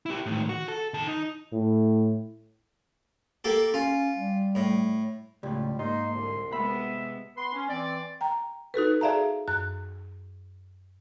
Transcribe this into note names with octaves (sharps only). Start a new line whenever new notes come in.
E4 G4
A2 D#3
F#4
A4
D#3 A5
D#4
A2
A#3 G4 A4
C#4 F4
G3
A2
C#2 A2 G3
G#2 A#3 D#4 C6
C2 D3
C3 G#3 B3 E5 B5
B3 B4 C6
C#4
E3 C4 D5
G5 A#5
D#4 F#4 A4 B4
G#4 D5 E5 F5 A5 A#5
F#2 F#6